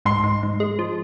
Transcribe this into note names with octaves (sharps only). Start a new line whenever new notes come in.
G#2 C6
G#2
G#2
G#3
F3